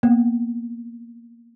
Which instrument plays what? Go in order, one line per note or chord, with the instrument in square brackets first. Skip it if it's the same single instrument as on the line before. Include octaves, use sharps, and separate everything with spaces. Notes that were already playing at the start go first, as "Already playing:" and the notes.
[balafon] A#3 B3